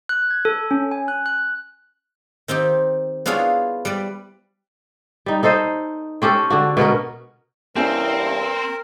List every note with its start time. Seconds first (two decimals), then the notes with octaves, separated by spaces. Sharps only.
0.09 F#6
0.30 G#6
0.45 A4
0.71 C#4
0.91 G#5
1.08 F#6
1.26 F#6
2.48 D#3 C4 D#4 G4
3.26 B3 D4 E4 F4 G#4 C#5
3.85 G3 B4 D5
5.26 G3 D#4
5.43 D#4 A4 C5 D#5
6.22 C4 C#4 G4 A4
6.50 D3 D4 F#4
6.77 B2 B3 C#4 A#4
7.76 E2 G2 C3 C4 C#4 E4 G4 A#4